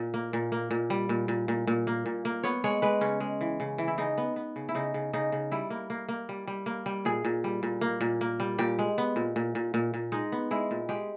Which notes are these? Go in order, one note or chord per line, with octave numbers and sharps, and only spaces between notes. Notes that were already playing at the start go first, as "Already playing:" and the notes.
Already playing: A#2
A#3
A#2
A#3
A#2
G3
A#2
A#2
A#2
A#2
A#3
A#2
A#3
B3 C#5
G#3 C#5
G#3 B4
C#3 C#4
G#3
E3
C#3
E3
E4
C#3 D#4
B3
B3
C#3
E4
C#3 D#4
C#3
C#3 D#4
C#3
G3 E4
A#3
A#3
A#3
G3
G3
A#3
G3
A#2 G#4
A#2
G3
A#2
A#3
A#2
A#3
G3
A#2 G4
G#3
B3
A#2
A#2
A#2
A#2
A#2
G#3 D#4
B3
G#3 E4
A#2
G#3 G4